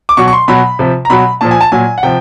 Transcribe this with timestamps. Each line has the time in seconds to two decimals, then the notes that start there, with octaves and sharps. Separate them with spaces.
0.09 D6
0.17 B2 F#3 C#6
0.28 C#6
0.33 C6
0.48 B2 F#3 B5
0.79 C3 F3
1.05 A#5
1.10 B2 F#3 B5
1.41 A#2 F3 A5
1.51 G#5
1.61 A5
1.72 A#2 F#3 G#5
1.98 F#5
2.03 C3 F3 G5